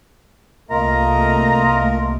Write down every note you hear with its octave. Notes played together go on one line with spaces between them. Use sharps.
C2 A3 A#3 F4 A#4 D#5 A#5